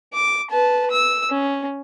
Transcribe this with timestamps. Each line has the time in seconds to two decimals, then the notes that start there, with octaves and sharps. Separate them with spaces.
0.14 D6
0.51 B4 A5
0.91 E6
1.30 C#4